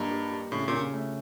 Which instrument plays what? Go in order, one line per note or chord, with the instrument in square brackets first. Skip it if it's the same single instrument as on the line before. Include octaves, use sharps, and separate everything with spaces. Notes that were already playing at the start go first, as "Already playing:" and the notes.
Already playing: [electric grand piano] G2 [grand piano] G3 A#3 D#4
[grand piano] G3
G3
[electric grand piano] A2 [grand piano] C#3
[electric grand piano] A#2
[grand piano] C#3
A3